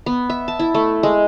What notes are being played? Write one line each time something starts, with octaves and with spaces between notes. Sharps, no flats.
B3
E5
A5
E4
A3
G#3